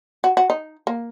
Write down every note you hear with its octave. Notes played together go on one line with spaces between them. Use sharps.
F#4
F#4
D#4
A#3